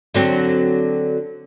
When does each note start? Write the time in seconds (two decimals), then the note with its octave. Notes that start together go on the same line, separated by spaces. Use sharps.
0.14 D3 F#3 C4